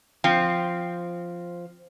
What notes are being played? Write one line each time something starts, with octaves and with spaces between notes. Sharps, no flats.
F3 C4